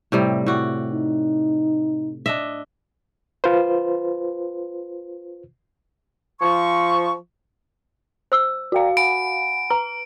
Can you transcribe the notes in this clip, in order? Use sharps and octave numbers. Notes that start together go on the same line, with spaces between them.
A2 C3 G3
A2 F#4 D5
D#4
D4 D#5 E5
F4 B4 C5
F3 C#6
C5 E6
F#4 D5 F5 G5 A#5
F#5 G#5 B5 D7
B4 A#5